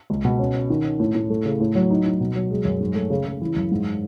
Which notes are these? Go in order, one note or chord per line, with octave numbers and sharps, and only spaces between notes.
C#2
B2
C#4
C#4
D#3
C#4
A2
A2
A3
C#3
A2
F#3
D#4
D#4
B2
F#3
G#3
F#2
G#2
A3
C#3
C#3
E3
F#2
G#2